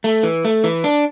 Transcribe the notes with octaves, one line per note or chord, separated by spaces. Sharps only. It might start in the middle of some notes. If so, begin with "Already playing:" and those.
A3
E3
A3
E3
D4